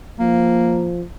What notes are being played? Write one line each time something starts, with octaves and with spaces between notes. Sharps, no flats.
F3 A#3